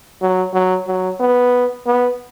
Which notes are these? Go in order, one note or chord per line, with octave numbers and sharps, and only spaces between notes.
F#3
F#3
F#3
B3
B3